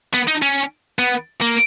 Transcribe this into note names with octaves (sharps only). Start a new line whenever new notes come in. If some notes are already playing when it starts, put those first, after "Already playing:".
B3
D#4
C#4
B3
A#3